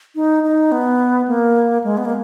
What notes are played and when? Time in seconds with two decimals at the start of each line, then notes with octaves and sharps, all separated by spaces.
0.15 D#4
0.43 D#4
0.72 B3
1.28 A#3
1.84 G#3
1.97 B3
2.05 A#3